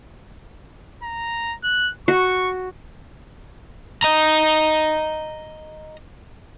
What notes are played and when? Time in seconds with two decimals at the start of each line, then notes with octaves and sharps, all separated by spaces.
1.03 A#5
1.63 F#6
2.08 F#4 C#6
4.02 D#5 A#5